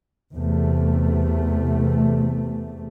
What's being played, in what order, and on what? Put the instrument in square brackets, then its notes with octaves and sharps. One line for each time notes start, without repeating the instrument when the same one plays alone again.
[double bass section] E2 C3 A3